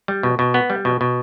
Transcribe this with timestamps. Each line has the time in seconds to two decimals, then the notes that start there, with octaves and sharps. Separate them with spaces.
0.08 G3
0.23 B2
0.39 B2
0.54 B3
0.70 G3
0.85 B2
1.01 B2